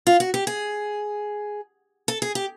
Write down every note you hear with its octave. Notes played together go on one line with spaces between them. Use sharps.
F4
F#4
G4
G#4
A4
G#4
G4